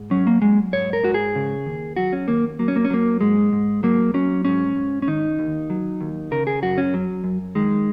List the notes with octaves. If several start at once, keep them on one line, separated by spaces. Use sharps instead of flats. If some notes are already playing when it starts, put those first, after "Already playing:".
Already playing: G#2
F#3 C#4
A#3
F#3 G#3
G#2 C#5
A#4
G#2 F#4
G#4
C#3
D#2
F#3 F#4
C#4
D#2 A#3
F#3 A#3
C#4
A#3
C#4
F#3 A#3
G#2 G#3
G#2
F#3 A#3
F#3 C#4
G#2 C#4
G#2
C#4
D#3 D#4
D#2
F#3
D#2
C#3 A#4
G#4
F#2 F#4
C#4
F#3
F#2
D#3 G#3